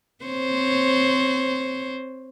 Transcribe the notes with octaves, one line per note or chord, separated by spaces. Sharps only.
C4 C5 C#5